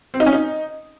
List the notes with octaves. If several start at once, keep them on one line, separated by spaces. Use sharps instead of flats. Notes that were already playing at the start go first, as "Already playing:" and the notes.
C4
D#4
C#4
D#4